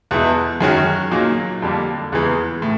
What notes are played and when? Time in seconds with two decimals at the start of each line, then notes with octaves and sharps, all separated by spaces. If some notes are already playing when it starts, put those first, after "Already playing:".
0.11 E2 B2 G#3 B3 E4
0.61 F#2 D#3 G#3 C#4 F#4
1.11 A#2 F#3 A#3 D#4 G#4
1.62 F2 D3 G3 A#3
2.12 E2 C#3 E3 G#3
2.62 A2